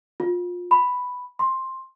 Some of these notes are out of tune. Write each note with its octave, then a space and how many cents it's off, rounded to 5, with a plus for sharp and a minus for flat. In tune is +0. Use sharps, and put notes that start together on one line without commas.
F4 +25
B5 +5
C6 +10